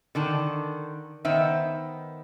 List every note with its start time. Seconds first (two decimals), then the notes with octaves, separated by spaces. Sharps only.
0.15 D3 D#3 A5
1.25 D#3 B3 C5 E5